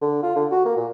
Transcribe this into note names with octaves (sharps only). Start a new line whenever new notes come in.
D3
F4
D3
F#4
A#3
A#2